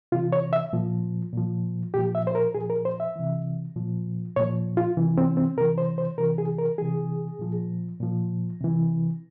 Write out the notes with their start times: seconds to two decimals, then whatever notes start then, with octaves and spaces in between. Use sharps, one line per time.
0.12 C3 E3 F4
0.33 C#5
0.53 E5
0.73 A#2 F3
1.33 A#2 F3
1.94 A#2 F3 G4
2.15 E5
2.27 C5
2.35 A#4
2.54 A#2 G#4
2.57 F3
2.70 A#4
2.85 C5
3.00 E5
3.16 C3 E3
3.76 A#2 F3
4.36 A#2 F3 C#5
4.77 F4
4.97 C3 E3
5.18 C4
5.37 C4
5.58 C3 A#4
5.61 E3
5.78 C5
5.98 C5
6.18 C3 E3 A#4
6.38 G#4
6.59 A#4
6.78 C3 E3 G#4
7.39 A#2 F3
8.00 A#2 F3
8.61 C3 E3